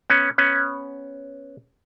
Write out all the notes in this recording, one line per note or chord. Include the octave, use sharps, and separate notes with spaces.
B3 C#4
B3 C#4